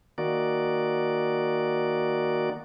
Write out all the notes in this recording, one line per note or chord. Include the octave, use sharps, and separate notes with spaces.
D#3 A#3 F#4 D5